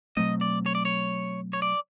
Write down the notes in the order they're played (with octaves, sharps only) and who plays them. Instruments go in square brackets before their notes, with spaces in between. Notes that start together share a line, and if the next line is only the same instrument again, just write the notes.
[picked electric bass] B2 F#3 A3 C4 [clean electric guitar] D#5
[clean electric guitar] D5
C#5
D5
C#5
C#5
D5